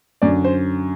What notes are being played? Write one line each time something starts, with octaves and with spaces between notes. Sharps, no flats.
F#2 D3 D5
C5